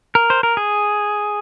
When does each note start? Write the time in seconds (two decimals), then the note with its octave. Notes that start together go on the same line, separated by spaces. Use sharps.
0.15 A#4
0.30 C5
0.43 A#4
0.57 G#4